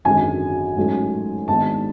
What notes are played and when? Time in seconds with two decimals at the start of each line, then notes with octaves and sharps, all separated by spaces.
0.05 G#1 F#2 D3 G#3 G#5
0.76 A1 G#2 F#3 A3 C#4
1.48 G#1 G#2 G#3 B3 D4 A5